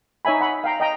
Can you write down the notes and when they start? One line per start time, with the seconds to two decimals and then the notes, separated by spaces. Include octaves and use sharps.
0.25 D#4 C#5 E5 G#5 B5
0.41 F#5 B5
0.64 F5 G5 A#5
0.80 D#5 G5 A#5